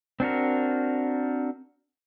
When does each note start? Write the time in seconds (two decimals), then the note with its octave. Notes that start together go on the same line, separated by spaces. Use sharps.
0.20 C4 D4 F#4 A#4